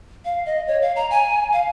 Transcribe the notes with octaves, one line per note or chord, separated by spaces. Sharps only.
F5
D#5
C#5
F5
A#5
G#5
F5